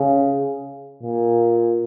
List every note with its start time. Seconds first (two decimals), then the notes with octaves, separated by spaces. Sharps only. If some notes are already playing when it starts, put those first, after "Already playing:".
Already playing: C#3
1.03 A#2